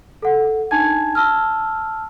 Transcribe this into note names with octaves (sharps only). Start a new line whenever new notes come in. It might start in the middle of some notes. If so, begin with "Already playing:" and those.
A4 F#5
D4 D#4 G#5 A5 G#6
A5 E6 F6